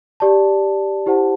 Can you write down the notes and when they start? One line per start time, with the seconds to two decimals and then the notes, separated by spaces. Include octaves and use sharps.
0.20 G4 D5 A5
1.06 E4 G4 C5 F#5 A5